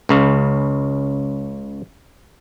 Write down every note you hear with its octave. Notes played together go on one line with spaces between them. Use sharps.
C#2 C#3